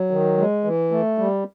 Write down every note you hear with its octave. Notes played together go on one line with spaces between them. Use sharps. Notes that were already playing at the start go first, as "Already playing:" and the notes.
Already playing: F#3
D#3
G#3
E3
A3
G3